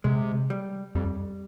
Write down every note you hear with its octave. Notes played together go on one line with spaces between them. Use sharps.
C3 G#3
G3
F2 G3